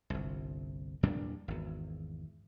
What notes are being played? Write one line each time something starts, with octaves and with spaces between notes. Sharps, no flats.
G1 C2
E2 A#2 G3 D4
G#1 E2